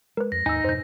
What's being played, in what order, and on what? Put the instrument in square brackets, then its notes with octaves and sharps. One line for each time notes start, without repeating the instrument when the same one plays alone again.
[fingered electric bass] G#3 [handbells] A#4 B4
[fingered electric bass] F2 [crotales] A#6
[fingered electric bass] D#2 G#2 [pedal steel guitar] D#4 [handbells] G#5 E6
[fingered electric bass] F2 G#2 B2 [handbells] C5 G6